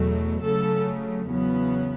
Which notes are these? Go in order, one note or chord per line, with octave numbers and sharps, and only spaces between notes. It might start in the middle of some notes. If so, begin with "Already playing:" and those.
Already playing: E2 B2 F#3 A3
C#3 F#3 A3 A4
E2 C#3 F#3 B3